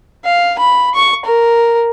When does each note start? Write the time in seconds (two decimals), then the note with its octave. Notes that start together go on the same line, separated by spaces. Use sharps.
0.25 F5
0.59 B5
0.95 C#6
1.25 A#4